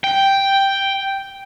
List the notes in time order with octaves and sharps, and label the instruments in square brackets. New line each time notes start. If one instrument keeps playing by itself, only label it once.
[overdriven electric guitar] G5